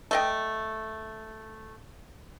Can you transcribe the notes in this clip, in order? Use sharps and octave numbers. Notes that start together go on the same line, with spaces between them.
A3 D#5 G5